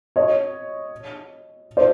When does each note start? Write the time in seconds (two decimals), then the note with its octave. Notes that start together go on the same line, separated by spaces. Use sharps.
0.16 C#5 D#5
1.77 C5 D5